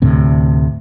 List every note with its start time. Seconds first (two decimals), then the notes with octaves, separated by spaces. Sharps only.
0.02 D2 A2 C3